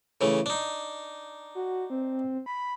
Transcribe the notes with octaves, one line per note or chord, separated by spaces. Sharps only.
C#3 E3 A3
D4 D#4
F#4
C4
B5